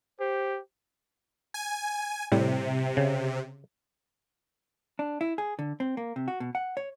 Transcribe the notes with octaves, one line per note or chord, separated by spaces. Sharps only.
G4 C5
G#5
A2 C3 G3
C#3
D4
E4
G#4
D3
C4
A#3
C3
F#4
B2
F#5
C#5